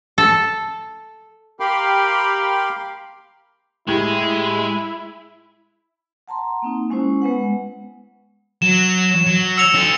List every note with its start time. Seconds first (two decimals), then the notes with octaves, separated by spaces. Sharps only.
0.18 A4
1.60 G4 A#4 F5 G5 B5 C6
3.87 A2 G#3 E4 G4 G#6
6.28 F#5 A5 A#5 C6
6.62 A#3 C4 D#4
6.90 G#3 C#4 E4 C5
7.22 G#3 B3 B4 F#5
8.62 F#3 E7
9.27 F#3
9.57 E6 C#7 F7
9.75 F#4 A4